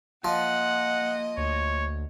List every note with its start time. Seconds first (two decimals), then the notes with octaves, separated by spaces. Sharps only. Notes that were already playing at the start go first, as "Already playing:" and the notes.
0.25 F3 A#3 D#5 F#5
1.37 D2 C#5